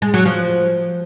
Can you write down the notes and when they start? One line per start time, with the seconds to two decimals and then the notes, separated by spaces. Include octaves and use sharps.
0.02 G#3
0.14 F#3
0.26 F3